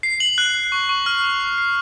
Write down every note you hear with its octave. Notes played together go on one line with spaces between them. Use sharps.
C7
F#7
F#6
F#6
C#6
C#6
F6
F7
C7
C7